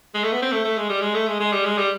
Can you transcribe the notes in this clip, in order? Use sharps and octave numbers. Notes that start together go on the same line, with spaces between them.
G#3
A3
B3
C4
A3
A3
G#3
G3
G#3
A3
G#3
G#3
G3
G#3
G3